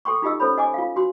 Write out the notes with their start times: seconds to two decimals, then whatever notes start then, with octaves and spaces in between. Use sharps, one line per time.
0.05 A4 G5 C6 C#6
0.22 D#4 F4 G4 D#5 E6
0.40 C#4 A4 C5 C#5 B5
0.58 D#5 G#5 D6
0.74 F4 F5
0.96 F#4 C6